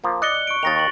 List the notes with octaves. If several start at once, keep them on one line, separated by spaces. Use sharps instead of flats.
F3 A#3
D5 D#5 F#6 C#7 G7
G7
C#6 D7
D#2 D#3 A6 A#6 F7
C#6 F#7